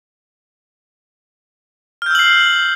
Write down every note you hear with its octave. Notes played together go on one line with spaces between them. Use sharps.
E6 F6 G6 C7 F#7